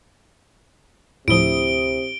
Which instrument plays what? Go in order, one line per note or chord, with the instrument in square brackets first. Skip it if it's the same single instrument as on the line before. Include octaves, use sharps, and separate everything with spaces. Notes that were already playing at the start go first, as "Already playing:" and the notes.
[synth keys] D2 E4 D#6 [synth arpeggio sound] A2 F3 [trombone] C3 [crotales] D7 G7